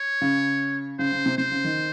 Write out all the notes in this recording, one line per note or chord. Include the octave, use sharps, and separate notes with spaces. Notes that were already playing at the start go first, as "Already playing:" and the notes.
Already playing: C#5
C#3
C#3 C5
C#3
C3
C3 C5
C#3
D#3